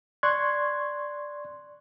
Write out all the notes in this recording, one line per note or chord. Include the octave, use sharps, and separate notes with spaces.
D5 C6 C#6 F#6 G#6